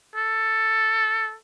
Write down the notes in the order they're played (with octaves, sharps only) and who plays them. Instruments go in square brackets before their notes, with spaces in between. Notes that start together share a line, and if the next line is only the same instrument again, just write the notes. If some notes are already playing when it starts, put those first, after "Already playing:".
[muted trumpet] A4